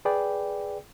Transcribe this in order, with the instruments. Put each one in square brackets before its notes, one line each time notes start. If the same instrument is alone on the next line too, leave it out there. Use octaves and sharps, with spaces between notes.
[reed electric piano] G#4 B4 D5 G5